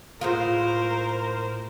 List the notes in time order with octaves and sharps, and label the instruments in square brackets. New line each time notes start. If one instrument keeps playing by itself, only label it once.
[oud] A2 G#3 F4 [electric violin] A#4 C5